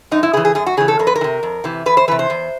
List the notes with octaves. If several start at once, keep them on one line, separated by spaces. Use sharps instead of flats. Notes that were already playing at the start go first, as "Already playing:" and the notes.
F#2 D#4
E4
C#3 E3 G#4
G#4
F#2 G#4
F#4
C#3 E3 G#4
A4
F2 A#4
B4
A#4
E3
C3
F2
C3 E3
E2 B4
C5
C3 E3 B4
C5
E2